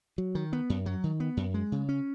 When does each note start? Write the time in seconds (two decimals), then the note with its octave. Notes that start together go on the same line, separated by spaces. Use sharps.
0.18 F#3
0.35 D#3
0.53 B3
0.70 F#2
0.86 F#3
1.04 D#3
1.20 B3
1.37 F#2
1.54 G#3
1.72 C#3
1.89 C#4